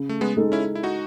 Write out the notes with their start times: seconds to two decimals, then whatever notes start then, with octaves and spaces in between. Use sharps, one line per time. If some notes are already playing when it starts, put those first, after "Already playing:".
Already playing: C#3
0.09 A3
0.21 G#3 B3
0.37 G#3 D#4 A4
0.52 C#4 E4
0.75 E4
0.83 D#4 F#4